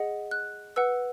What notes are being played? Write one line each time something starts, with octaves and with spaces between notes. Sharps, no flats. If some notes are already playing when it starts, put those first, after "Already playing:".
Already playing: G#4 D#5 F#5
F#6
B4 F#5 E6